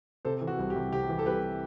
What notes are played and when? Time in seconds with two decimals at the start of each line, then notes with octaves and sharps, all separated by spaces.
0.25 C3 A4 C5
0.41 E3
0.47 F#4
0.59 C2
0.70 G4
0.76 C2
0.92 C3 G4
1.09 E3
1.19 A4
1.26 C2 G4 B4